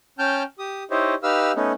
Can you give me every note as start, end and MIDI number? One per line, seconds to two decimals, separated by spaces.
0.19 0.43 61
0.19 0.43 79
0.19 0.43 81
0.19 0.43 89
0.19 0.43 91
0.59 0.83 67
0.59 0.83 87
0.91 1.15 63
0.91 1.15 64
0.91 1.15 67
0.91 1.15 72
0.91 1.15 73
0.91 1.15 75
1.23 1.52 63
1.23 1.52 67
1.23 1.52 71
1.23 1.52 77
1.23 1.52 88
1.23 1.52 89
1.56 1.72 57
1.56 1.72 59
1.56 1.72 61
1.56 1.72 63